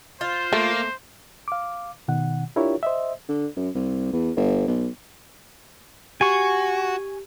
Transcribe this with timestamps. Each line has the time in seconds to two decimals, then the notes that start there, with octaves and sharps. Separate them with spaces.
0.21 F4 C5
0.53 A3 A#3
1.48 F5 D6
2.08 B2 D#3 F#5
2.56 D4 E4 F4 G4 A#4 C#5
2.83 C5 D#5 E5
3.29 D3
3.56 F#2
3.75 C2
4.12 E2
4.36 G1
4.67 B1
6.21 F#4 G4 G#5 C#6